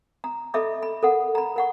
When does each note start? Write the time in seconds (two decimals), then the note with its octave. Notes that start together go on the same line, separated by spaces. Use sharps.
0.24 A#5
0.54 A4 D#5 E5 B5 D6
0.83 B5
1.03 A4 A#4 F#5
1.35 A#5 B5
1.56 A#4 F#5 C#6